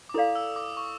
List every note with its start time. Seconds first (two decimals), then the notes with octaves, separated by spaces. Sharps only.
0.09 D6
0.14 E4 A4 D5 F5 D#6
0.35 E6
0.56 D6
0.77 C#6